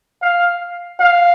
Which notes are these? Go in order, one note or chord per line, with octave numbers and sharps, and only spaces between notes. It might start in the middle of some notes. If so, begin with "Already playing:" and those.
F5
F5